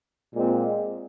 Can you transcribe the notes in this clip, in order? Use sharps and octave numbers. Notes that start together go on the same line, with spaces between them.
A#2 G#3 C4